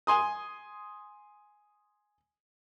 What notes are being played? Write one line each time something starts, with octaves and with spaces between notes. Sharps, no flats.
G#5 C6 D#6